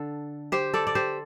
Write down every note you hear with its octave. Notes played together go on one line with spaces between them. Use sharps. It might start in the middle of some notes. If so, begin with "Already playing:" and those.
Already playing: D3 A4
G4 C5
A4 D5
D5
G4 C5